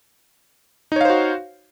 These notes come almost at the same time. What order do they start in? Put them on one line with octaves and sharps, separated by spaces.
D#4 C#5 F5 C5 F#4